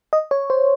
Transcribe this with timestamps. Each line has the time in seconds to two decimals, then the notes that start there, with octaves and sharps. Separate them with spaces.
0.13 D#5
0.31 C#5
0.50 C5